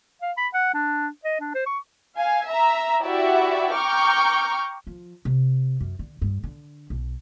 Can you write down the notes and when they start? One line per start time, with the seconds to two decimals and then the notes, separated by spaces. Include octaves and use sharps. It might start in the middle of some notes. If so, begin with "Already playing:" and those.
0.22 F5
0.37 B5
0.54 F#5
0.74 D4
1.25 D#5
1.40 D4
1.55 C5
1.66 C#6
2.15 F5 G#5
2.47 E5 A#5
3.03 E4 F#4 G4 D5 E5
3.74 G5 A#5 C#6 D6 F6 G6
4.87 F3
5.25 C3
5.80 F#2
5.99 D3
6.22 G2
6.44 D3
6.90 B1